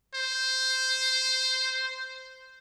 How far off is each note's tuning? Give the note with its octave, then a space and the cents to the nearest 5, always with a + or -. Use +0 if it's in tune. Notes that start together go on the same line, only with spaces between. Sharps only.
C5 -5